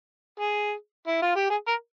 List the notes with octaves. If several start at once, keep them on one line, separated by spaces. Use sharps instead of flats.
G#4
E4
F4
G4
G#4
A#4